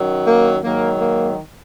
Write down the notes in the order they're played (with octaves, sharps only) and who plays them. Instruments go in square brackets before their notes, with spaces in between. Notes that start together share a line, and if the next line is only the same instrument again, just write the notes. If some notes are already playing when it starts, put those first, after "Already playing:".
Already playing: [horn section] F#2 D#3 F#3
A#3
G#2 D#3 F#3 A#3
A#3